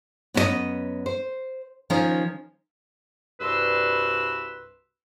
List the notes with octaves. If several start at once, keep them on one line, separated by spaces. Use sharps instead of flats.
F#2 B3 C#4 E4 D#5
C5
D#3 F3 C#4 D#4 A#4 C5
C2 G2 F#4 B4 C6 E6